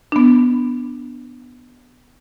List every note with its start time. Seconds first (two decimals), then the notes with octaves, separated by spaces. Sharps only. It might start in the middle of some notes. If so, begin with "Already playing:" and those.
0.12 B3 D4